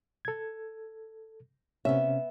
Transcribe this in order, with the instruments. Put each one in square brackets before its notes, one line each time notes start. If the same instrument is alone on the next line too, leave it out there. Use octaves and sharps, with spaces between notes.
[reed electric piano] A4 G#6
[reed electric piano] C3 C#4 [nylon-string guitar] B3 E5